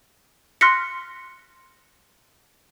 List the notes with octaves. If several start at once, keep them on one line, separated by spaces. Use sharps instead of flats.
C6 F6 F#6 A#6 B6 C#7